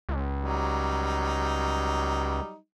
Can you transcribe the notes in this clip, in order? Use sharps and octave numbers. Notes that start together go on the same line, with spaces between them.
C#2
F#3 G3 D#4